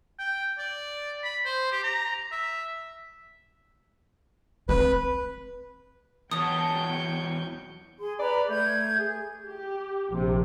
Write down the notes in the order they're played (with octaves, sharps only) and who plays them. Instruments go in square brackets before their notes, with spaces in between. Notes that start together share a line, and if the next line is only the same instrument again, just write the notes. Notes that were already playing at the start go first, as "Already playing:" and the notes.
[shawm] G5
D5
B5
C5
G4
A#5
E5
[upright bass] C4 [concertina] B4
[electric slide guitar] E2 F#3 [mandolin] C#5 A5 [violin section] G5 C#6 G6 [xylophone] D#6
[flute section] G#4 C6
[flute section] B4 A#5 B5 [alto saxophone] D5
[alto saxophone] A3 [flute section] G6 G#6
[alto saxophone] G#4
[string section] G4
A#1 C3